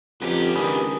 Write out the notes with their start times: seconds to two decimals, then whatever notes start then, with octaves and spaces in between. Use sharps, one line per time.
0.22 F2 B3 C#4 D#4 G4
0.55 C#2 D#3 D4 G#5 B5 D#6